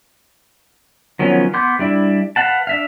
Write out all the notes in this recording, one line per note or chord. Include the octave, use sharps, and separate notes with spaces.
D#3 F3 F#3 B3 C#4
B3 C6 D6 G6
G3 D4 E4
B4 F5 F#5 A5
D4 E5 F5